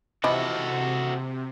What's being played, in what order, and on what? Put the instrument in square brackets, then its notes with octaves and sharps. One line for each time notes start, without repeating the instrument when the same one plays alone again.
[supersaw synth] C3 [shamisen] E3 F3 E4 [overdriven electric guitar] F#4 A4 [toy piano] D#5